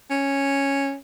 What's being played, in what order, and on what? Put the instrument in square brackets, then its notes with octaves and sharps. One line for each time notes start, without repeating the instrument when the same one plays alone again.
[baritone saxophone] C#4